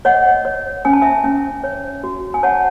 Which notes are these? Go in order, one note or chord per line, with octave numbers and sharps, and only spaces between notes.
C#5 D#5 F#5
C#5
C#4 G#5
A5
E5 G#5
C#4
C#5
F#4
G#5
C#5 F#5 A5